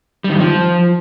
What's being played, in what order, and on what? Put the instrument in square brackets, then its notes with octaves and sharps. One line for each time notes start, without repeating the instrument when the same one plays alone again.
[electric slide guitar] G3
D#3
G2
F3